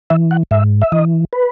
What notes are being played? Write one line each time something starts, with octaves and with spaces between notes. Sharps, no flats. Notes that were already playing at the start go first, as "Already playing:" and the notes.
E3 E5
F#5
G#2 E5
E5
E3 D#5
B4